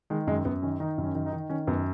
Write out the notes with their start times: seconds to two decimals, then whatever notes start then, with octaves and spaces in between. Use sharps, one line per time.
0.10 D#3 G#3
0.27 F#2 G#3
0.45 F#2 B3
0.62 D#3 C#4
0.80 D#3 D#4
0.98 F#2
1.04 C#4
1.15 D#3
1.26 D#4
1.33 D#3
1.50 D#3 C#4
1.67 F#2 B3